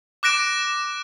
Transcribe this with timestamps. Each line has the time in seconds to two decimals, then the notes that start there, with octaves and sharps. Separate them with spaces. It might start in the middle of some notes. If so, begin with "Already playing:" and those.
0.23 D6 F#6 A#6 D7 E7